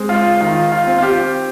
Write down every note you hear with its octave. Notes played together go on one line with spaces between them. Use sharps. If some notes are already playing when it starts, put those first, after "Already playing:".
Already playing: G#3 C4
F4
D#3 F4
F4
C4
F4
G4